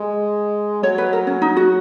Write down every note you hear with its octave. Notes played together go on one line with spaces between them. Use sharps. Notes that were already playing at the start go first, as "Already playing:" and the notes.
Already playing: G#3
F#3 C#5
B4
A#4
C#4
D#4
F#4